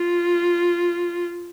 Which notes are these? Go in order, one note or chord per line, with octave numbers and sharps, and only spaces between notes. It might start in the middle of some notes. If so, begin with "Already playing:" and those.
Already playing: F4